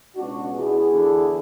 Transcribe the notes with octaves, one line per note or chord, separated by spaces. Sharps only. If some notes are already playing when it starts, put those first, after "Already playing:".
C#2 B2 D4 F#4
E2 B2 E4 G#4
E2 D3